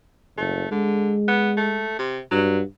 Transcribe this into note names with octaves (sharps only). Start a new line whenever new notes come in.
F#1 A3
D3 G#3
B3
A3
C3
G2 F#3